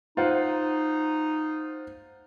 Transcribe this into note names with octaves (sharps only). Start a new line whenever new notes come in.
D#4 F4 C5 F#5